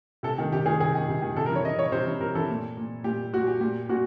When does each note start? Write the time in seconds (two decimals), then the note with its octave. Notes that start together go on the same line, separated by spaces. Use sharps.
0.23 C3 A4
0.38 D#3
0.52 C3 G4
0.66 D#3 G#4
0.80 C3 G#4
0.95 D#3
1.08 C3
1.22 D#3
1.36 C3 A4
1.46 A#4
1.50 E3
1.56 C#5
1.64 C3 D#5
1.78 E3 C#5
1.92 C3 C5
2.06 E3
2.20 C3 A#4
2.35 E3 A4
2.49 A#2
2.77 A#2
3.04 A#2 G4
3.33 A#2 F#4
3.47 G4
3.61 A#2 G4
3.89 A#2 F#4